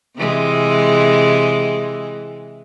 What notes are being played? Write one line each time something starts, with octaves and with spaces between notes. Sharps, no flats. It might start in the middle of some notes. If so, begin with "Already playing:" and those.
C3 E3 G#3